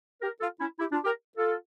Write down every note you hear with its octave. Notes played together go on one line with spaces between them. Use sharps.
G4 A#4
F4 A4
C#4 E4
E4 G4
D4 F4
G4 A#4
F4 A4